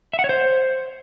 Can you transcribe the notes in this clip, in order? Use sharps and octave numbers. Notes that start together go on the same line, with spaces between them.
E5
F#5
C#5
C5